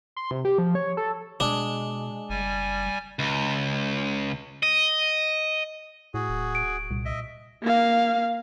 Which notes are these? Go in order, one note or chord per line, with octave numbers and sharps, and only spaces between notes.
C6
C3
G4
F3
C#5
A4
B2 G#3 D4
F#1 G3 G#5
C#2
D#5
A2 F#4 G#4
D1
D7
C2 A#2
D#5 E5
A#3 F5